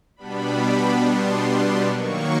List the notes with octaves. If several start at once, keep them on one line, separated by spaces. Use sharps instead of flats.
B2 G3 B3 D4 B5
C6
D#3 F#3 A#3 C#6